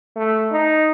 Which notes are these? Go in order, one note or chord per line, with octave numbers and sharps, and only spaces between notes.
A3
D#4